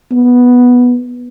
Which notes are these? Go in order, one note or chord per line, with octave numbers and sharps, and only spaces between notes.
B3